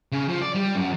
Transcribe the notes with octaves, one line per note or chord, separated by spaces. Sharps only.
C#3
F3
D5
G3
F#2